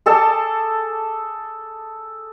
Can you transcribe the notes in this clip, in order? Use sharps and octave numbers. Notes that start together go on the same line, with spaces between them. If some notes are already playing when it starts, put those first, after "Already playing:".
G#4 A4 A5 D6